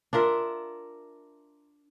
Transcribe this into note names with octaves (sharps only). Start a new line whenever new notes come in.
D4 F4 A#4 E5